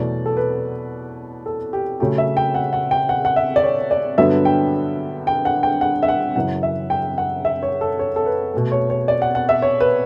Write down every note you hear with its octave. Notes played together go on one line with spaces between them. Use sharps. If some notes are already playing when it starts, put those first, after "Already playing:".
Already playing: E2 B2 F#3 A3 D5
A4
B4
A4
G4
C#3 F#3 A3 G4
E5
G5
F#5
F#5
G5
F#5
F#5
E5
D5
C#5
D5
G2 D3 F#3 B3 E5
G5
G5
F#5
G5
F#5
E5
F#5
F#2 C#3 E3 F#5
E5
G5
F#5
E5
C#5
A4
C#5
A4
B4
B2 A3
C#5
C#5
D5
F#5
F#5
E5
C#5
B4